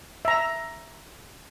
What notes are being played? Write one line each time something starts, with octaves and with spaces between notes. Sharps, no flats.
E5 A#5